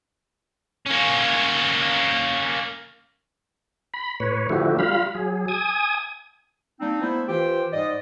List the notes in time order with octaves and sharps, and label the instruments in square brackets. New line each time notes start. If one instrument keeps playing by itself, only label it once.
[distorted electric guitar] A#3 C#4
[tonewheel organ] B5
A2 B4 C#5
D3 F3 A3 E4 F#4 G4
G3 F4 F5 B5
F#3 G#4
G#5 D#6
[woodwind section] G3 A#3 C4 D4 D#4
A3 B3 E4 C5
E3 F4 G4 C5 G5
G#2 G3 D5 D#5